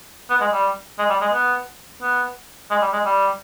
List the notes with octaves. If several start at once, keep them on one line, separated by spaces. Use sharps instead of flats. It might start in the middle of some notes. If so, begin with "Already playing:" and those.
B3
G#3
G3
G#3
G3
G#3
B3
B3
G#3
G3
G#3
G3